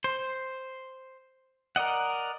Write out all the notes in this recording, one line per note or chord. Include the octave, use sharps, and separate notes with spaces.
C5
A#4 D5 D#5 F#5